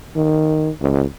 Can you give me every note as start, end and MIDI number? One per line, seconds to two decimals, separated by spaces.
0.16 0.71 51
0.81 1.03 37